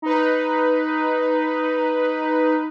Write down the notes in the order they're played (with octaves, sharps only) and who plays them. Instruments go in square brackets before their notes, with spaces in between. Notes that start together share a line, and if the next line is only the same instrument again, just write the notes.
[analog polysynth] D#4 B4